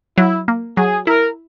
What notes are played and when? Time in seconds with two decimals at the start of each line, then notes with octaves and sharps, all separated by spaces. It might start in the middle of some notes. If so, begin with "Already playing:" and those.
0.18 F#3 E4
0.48 A#3
0.77 F#3 G#4
1.07 E4 A#4